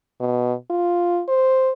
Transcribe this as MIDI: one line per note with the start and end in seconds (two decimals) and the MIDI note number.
0.20 0.54 47
0.70 1.22 65
1.28 1.72 72